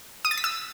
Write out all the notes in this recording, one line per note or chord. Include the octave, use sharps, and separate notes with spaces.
D#6
A6
B6
E6